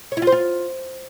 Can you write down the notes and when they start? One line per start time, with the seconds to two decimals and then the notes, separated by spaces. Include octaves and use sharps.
0.12 C#5
0.17 E4
0.22 F4
0.27 C5
0.32 F4